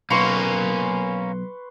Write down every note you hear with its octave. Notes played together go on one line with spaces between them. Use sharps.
B1 A#3 C#4 B4 C6 C#6